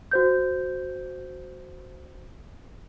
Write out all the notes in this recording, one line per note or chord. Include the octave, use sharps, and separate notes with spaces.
F#4 C5 G6